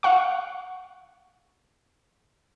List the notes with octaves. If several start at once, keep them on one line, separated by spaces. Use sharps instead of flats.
F5 F#5 C#6